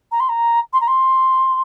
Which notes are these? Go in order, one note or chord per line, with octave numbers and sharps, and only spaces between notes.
A#5
C6
A#5
C6
A#5
C6